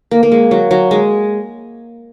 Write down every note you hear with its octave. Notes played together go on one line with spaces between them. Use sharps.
A#3
A#3
G#3
F#3
F#3
G#3